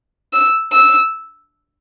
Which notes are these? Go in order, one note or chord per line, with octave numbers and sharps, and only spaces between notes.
E6
E6